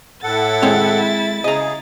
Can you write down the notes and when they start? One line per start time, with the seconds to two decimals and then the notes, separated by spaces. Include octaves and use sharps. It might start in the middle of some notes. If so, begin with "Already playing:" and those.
0.23 A2 E4 A4 F#5 A6
0.62 G#3 C4 C#5
1.44 C#3 G#4 D#5 A#5